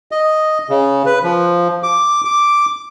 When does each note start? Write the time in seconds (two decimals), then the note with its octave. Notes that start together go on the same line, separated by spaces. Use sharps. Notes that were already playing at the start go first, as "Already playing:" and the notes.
0.12 D#5
0.70 C#3
1.06 B4
1.24 F3
1.83 D6
2.25 D6